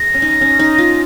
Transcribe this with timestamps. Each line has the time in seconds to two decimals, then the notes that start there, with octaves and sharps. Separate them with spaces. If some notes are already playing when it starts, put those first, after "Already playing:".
Already playing: G#4 A#6
0.14 C#4
0.22 D#4
0.41 C#4
0.59 D#4
0.78 F4